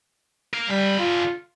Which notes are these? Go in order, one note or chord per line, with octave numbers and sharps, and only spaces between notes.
A#4 F5
D3 G3 B5
F4